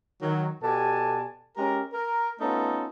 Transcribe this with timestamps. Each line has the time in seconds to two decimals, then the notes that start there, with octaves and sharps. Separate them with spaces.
0.22 D#3 F#3
0.63 B2 G4 A4 D5 G#5 A5
1.57 G#3 C#4 G4 A#4
1.93 A#4
2.40 A3 B3 C#4 D#4 F4 A4